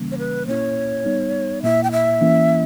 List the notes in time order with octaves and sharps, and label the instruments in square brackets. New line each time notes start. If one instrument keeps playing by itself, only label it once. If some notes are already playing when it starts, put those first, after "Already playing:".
Already playing: [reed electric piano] C#3 E3 G3 A#3 C#4
[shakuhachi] C#5
B4
[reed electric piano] A#2 A#3 C#4 E4 [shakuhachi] C#5
[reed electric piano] G3 B3 D#4
[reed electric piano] A#2 A#3 E4 [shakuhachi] E5
[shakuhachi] G5
E5
[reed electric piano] E3 A#3 C#4 E4